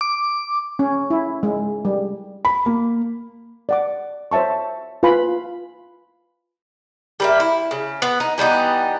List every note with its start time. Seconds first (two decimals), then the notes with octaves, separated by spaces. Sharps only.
0.01 D6
0.79 C#4
1.10 E4
1.43 G#3
1.85 G3
2.45 B5
2.66 A#3
3.69 D5 F#5 D6
4.32 C5 C#5 E5 A5 C#6
5.03 F4 B4 F5 G#5 B5
7.20 G3 A#3 E5
7.40 E4
7.71 C#3
8.02 B3
8.20 D#4
8.38 E3 G3 B3 D#4